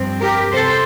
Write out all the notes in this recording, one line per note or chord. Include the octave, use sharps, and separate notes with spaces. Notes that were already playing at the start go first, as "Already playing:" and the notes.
Already playing: G2 F3 C4
G4 A#4
C3 A4 C5